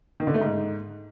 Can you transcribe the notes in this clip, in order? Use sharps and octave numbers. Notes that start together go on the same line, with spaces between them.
D#3
D3
A3
G#2